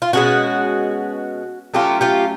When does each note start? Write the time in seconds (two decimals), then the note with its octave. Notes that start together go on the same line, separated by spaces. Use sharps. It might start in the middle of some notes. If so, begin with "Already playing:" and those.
0.02 F4
0.13 B2 G#3 C#4 F#4
1.74 F#3 A3 C#4 F4 G4
2.01 F4 G4